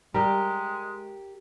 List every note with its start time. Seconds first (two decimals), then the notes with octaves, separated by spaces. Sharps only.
0.14 G3 G#3 G4 A#4